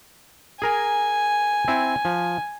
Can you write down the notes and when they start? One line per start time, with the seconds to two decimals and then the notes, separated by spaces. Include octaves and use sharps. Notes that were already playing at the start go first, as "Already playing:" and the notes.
0.62 G#4 A#4 G#5 A#5
1.68 C4 E4
2.05 F3